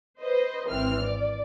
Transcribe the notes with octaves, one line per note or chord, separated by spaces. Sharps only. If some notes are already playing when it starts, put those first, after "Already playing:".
B4 C5 D#5
G#1 E3 C4 F6
D5